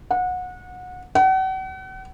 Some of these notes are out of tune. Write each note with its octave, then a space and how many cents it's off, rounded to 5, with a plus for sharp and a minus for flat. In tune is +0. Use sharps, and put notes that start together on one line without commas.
F#5 -25
F#5 +40